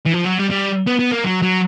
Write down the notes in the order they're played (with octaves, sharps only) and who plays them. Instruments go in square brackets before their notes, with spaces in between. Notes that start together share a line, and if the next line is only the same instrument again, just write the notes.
[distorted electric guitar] E3
F3
F#3
G3
G3
B3
B3
A#3
F#3
F#3